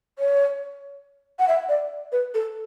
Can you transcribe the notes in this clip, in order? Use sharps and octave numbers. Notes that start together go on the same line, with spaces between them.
C#5
F#5
E5
D5
B4
A4